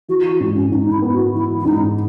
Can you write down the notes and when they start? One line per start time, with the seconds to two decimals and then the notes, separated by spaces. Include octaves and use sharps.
0.08 E3 F#4
0.24 F#4
0.40 G#2
0.55 C#4
0.71 G#2 D#4
0.82 D#4
0.92 E4
1.02 B3
1.13 F#4
1.34 E3 E4
1.60 E4
1.65 G#2 D#4